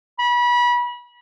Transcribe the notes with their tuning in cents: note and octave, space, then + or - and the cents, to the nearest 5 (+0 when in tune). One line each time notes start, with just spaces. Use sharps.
B5 -30